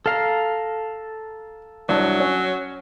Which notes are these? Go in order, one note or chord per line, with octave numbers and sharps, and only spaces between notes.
A4 F5 A#5 F6
C2 F#3 D4
C#4